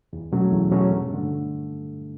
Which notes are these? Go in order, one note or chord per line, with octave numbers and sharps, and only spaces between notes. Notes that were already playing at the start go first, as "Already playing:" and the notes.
E2
B2 F#3 A3 C#4
E2
B2 F#3 A3 C#4
G2
D3 A3